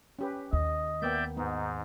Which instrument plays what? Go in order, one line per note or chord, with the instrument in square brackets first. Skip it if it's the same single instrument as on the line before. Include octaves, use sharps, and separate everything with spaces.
[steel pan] C#4 G4 B4
[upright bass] D#2 [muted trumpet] D#5
[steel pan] A#3 B3 G5 [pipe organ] D5 E5 G6
[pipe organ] G#2 [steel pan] B3 [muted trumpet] D#4